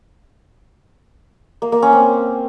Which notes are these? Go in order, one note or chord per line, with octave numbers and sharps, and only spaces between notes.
A#3
A#3
C#4
C4